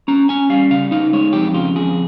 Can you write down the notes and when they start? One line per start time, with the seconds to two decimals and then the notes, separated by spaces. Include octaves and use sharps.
0.08 C#4 A#5
0.29 C#4 G#5
0.50 G3 F5
0.71 C#3 F5
0.91 D#4 F5
1.13 G#3 C#5
1.33 F2 G4
1.54 C#3 F4
1.75 F2 G#4